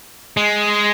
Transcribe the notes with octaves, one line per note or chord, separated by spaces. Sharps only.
G#3